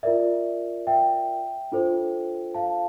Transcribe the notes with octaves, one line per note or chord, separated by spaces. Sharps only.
F4 A#4 D5 E5
E5 G5
D4 F4 A4 C5
F5 A5